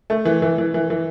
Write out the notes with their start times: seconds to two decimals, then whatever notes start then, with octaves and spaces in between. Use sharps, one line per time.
0.10 A3
0.25 E3
0.42 E3
0.58 E3
0.74 E3
0.90 E3